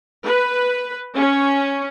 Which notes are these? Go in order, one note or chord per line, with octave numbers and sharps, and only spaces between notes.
B4
C#4